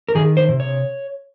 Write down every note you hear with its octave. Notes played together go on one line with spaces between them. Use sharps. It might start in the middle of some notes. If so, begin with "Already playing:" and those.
A#4
D#3 G#4
C5
C3
C#5